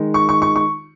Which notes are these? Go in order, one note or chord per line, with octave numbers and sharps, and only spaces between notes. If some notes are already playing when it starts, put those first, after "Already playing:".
Already playing: D#3 G#3 D#4
C#6
C#6
C#6
C#6